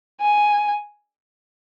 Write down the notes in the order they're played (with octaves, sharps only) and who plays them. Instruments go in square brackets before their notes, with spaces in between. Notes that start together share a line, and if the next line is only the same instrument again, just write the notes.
[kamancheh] G#5